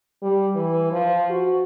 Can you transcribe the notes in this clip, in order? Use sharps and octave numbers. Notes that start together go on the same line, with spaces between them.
G3
E3
F3
F#4